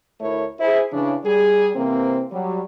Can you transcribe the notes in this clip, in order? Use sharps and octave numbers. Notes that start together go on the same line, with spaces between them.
D2 A3 E4 A#4 C#5
E4 G#4 C5
C#3 E3 D4
G3 G#4
C3 E3 A#3 C4
F#3 G3